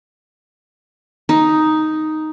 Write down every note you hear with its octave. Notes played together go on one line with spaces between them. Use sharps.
D#4